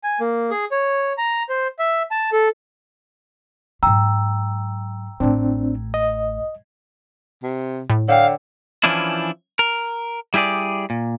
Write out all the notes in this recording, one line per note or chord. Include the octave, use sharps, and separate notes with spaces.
G#5
A#3
G#4
C#5
A#5
C5
E5
A5
A4
G#2 F#3 G5 A#5 E6
A1 A2 C4 D4
D#5
C3
A2
D3 C#5 F5 G5
E3 F3 C#4 D4 E4
A#4
G3 E4 G4 G#4 D5
A#2